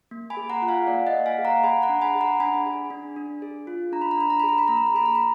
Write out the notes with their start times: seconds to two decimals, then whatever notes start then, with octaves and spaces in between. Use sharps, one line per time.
0.11 A#3
0.30 G#5 B5
0.37 G#4
0.49 F#5 A#5
0.62 F4 F#5
0.68 F5 G#5
0.87 A#3 D5
1.07 D#5 F#5
1.13 A#3
1.26 F5 G#5
1.38 G#4
1.45 F#5 A#5
1.64 G#4 G#5 B5
1.82 F#5 A#5
1.89 D4
2.01 G#5 B5
2.15 G#4
2.21 F#5 A#5
2.40 D4 G#5 B5
2.66 G#4
2.90 D4
3.16 D4
3.42 G#4
3.67 F4
3.92 D4 A#5
4.02 B5
4.11 A#5
4.18 D4 B5
4.30 A#5
4.40 G#4 B5
4.49 A#5
4.58 B5
4.68 A#3 A#5
4.77 B5
4.87 A#5
4.94 G#4 B5
5.06 A#5
5.15 B5